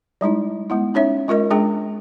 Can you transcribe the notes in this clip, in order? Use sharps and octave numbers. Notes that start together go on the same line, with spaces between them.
G3 G#3 D#4 E4
G#3 B3 E4
C#4 D#4 C#5 E5
G#3 F4 A#4 D#5
G#3 D4 G#4 G5